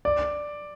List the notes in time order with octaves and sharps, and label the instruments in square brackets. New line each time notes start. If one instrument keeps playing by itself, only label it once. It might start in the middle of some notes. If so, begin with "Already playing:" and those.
[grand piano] D5